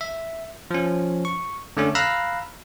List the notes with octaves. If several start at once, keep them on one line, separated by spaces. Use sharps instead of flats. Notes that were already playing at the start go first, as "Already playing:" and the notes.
E5
F3 C#4
C#6
D3 A3 C#4 A4
F5 A#5 B5 E6 F#6